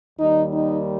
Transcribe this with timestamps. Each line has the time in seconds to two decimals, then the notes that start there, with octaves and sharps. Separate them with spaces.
0.19 D#2 D#3 G3 D#4
0.54 D#4